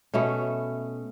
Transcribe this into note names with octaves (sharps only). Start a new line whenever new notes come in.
B2 A3 C#4